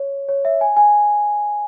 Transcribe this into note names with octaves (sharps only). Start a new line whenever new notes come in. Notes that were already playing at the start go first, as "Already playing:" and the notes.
Already playing: C#5
C#5
E5
G#5
G#5